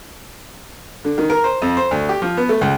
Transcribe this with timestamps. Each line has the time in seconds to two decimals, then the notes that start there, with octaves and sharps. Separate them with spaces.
1.05 D3
1.18 D#3
1.30 A#4
1.44 C5
1.62 F2
1.77 C5
1.91 D2
2.09 G4
2.22 F3
2.37 B3
2.49 A3
2.61 C#2